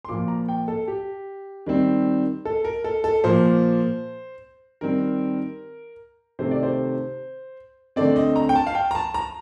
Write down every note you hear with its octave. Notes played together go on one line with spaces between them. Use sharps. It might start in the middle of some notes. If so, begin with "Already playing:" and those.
C6
A#2 F3 A#3 D6
A#5
G5
A4
G4
D#3 G3 C4
A4
A#4
A4
A4
A#2 F3 A#3 C5
D#3 G3 C4 A#4
C3 D#3 A3 C4 C5
D5
C5
D3 A3 C4 D5
D#5
A#5
G5
A5
F5
G5
A#5
A5
A#5